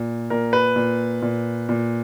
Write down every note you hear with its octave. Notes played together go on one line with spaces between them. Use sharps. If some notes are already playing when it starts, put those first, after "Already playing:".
Already playing: A#2
A#2 A#4
B4
A#2
A#2
A#2